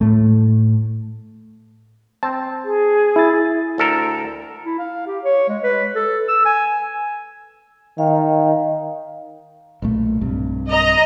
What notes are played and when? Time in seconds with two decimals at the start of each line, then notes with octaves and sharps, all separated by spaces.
0.01 A2 A3
2.23 C4 A5
2.65 G#4
3.16 E4 A6
3.78 D2 A4 A#4 A#5
4.65 E4
4.79 F5
5.07 G4
5.24 C#5
5.49 G#3
5.63 B4
5.96 A4
6.28 E6
6.45 G#5
7.98 D#3 F5
9.82 B1 A#2 A3
10.21 B1 G2 C3
10.70 D#5 A#5